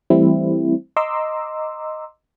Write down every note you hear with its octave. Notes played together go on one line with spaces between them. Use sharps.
E3 G3 A3 C4 E4
D#5 A#5 C6 D6 E6